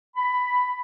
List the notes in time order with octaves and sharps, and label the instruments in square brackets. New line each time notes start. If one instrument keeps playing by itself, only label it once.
[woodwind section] B5